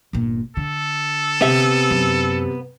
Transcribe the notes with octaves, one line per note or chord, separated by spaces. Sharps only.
G1 A#2
D3 A4
C3 B3 E5
F#2